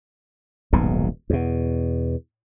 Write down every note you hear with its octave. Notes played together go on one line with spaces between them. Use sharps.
D#1 B1 G#2 B2
E2 B2